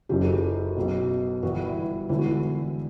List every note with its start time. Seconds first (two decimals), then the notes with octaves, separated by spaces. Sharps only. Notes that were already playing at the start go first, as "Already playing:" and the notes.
0.09 F#1 F#2 C#3 G4
0.21 A4
0.32 G4
0.76 B1 B2
1.43 G1 G2 E3 F#4
1.65 E4
2.09 E1 E2 D3 E4
2.18 F#4
2.27 E4